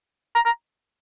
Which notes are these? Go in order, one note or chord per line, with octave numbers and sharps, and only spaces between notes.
A#5
A#5